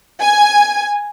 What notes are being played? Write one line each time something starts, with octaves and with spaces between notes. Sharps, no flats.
G#5